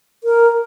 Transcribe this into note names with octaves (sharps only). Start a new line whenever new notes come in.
A#4